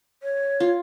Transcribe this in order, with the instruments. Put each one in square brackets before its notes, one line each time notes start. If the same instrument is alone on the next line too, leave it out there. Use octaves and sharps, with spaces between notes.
[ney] C#5
[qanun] F4